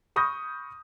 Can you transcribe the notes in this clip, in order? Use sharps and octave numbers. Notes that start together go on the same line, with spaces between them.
B5 C#6 D#6 F6 G6 A#6